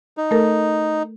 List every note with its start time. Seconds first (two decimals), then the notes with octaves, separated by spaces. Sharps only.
0.17 D#4
0.31 A3 A4 A#4